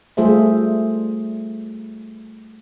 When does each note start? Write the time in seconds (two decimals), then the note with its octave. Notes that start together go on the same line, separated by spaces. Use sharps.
0.17 G3 A3 F4 G#4 C5 E5